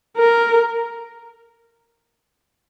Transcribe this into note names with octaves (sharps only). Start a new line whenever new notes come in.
A#4